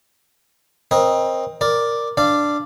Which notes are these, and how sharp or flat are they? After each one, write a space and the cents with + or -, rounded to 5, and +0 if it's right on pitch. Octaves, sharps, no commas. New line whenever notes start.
C4 +20 A#4 +35 D#5 +0
A#4 +0 D5 +0
D4 +0 D5 +0 F5 -20